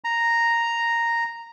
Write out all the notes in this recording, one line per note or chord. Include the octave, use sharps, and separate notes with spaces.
A#5